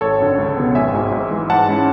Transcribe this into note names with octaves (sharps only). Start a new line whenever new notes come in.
G#1 A4 C#5
F#2 D3
C#2
B2 F#3 B3
G#1 E5 G#5
G#2 F#3
G#2
E3 G#3
G#2 F#5 A5
G#3 C#4 E4